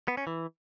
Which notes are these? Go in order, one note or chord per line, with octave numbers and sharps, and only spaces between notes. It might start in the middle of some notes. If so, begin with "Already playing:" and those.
B3
C#4
E3